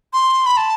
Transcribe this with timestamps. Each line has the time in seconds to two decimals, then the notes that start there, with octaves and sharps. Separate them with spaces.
0.13 C6
0.46 B5
0.57 A5